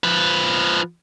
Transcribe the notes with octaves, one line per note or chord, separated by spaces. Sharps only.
F3 B4